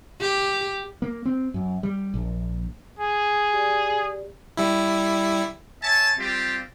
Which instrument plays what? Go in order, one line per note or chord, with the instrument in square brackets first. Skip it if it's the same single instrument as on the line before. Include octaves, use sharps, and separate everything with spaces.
[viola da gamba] G4
[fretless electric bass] A#3
C4
F#2
G3
A#1
[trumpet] G#4
[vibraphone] G4 D5
[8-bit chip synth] G3 E4
[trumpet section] C#5 E5 G#5 A5
G3 C4 F4 G4